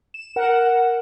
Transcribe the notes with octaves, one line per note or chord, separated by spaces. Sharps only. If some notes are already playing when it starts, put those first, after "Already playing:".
E7
A#4 F#5